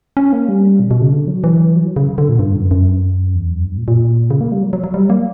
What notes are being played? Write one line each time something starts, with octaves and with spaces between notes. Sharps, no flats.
C#4
A#3
G3
B2
B2
C#3
D3
F#3
E3
F#3
C#3
D3
A#2
G2
F#2
F#2
E2
F#2
G2
A#2
A#2
C#3
A#3
G3
F#3
F#3
F#3
G3
A#3